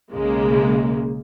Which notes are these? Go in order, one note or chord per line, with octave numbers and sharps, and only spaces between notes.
B1 C#3 G#3 A#3